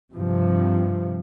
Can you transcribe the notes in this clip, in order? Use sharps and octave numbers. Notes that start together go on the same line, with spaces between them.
G2 C3 F3